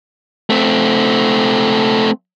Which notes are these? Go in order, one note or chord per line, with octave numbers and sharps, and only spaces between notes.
A3 C4